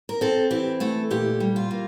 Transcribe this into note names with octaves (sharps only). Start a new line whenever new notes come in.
A#4
C4 A4
E3 G4
A3 A4
A#2 G4
G3
F4
A#3